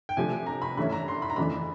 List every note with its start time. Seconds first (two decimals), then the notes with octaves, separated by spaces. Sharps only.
0.09 G5
0.17 C3 F3 A3 D4 G#5
0.46 A#5
0.62 B5
0.77 G2 E3 A3 C#4 E4 B5
0.92 A#5
1.08 C6
1.22 B5
1.30 A#5
1.36 F2 C#3 E3 A3 D4 B5